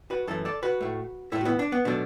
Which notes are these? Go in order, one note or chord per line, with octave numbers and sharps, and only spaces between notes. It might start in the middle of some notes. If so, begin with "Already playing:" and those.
F#4 B4
F#2 E3 A3 E4 A4
A4 D5
F#4 B4
A2 A3
A2 A3 E4 A4
F#4
B3 E4
D4
B3
B2 F#3 A3 D4